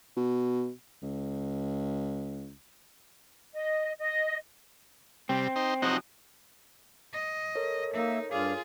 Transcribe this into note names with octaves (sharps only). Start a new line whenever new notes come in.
B2
C#2
D#5
D#5
C3 G3 C4
D#4 C5
C3 F3 F#3 C4 D#4 F#4
D#5
A4 A#4 C#5
A#3 D#4 E5
G2 F4 G#4 D5 F5